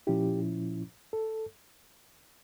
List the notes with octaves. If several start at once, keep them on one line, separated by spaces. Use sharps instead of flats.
A#2 F3 C#4 E4 G4
A4